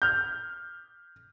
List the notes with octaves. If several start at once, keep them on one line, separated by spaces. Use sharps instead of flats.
F6 G6